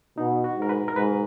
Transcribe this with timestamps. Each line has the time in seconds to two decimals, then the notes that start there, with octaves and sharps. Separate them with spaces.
0.18 B2 D#4
0.44 F#4
0.57 G#2 A#4
0.69 B4
0.88 A#4
0.96 G#2 B4